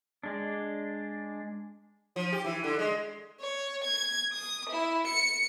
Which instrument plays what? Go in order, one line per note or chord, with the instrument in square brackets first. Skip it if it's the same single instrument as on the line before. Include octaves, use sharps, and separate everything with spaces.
[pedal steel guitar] G#3 D4
[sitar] F3
G4
E3
D3
G#3
[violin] C#5
G#6
D#6
E4
C#7